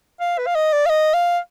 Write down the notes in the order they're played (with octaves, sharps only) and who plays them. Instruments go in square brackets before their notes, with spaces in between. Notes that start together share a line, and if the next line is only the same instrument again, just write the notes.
[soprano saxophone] F5
B4
F5
D#5
D5
F5
D#5
F5